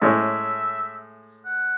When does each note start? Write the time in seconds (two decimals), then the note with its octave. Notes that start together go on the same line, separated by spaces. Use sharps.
0.02 A2 G#3 C#4 E4 G#4 E5
1.46 F#5